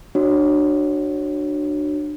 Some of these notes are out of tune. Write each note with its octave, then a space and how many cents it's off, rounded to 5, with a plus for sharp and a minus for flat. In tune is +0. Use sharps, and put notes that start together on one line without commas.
D4 +30 F#4 +10 C#5 -15